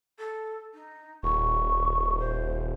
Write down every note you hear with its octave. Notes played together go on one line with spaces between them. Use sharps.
A4
D#4
D#1 C#6
C5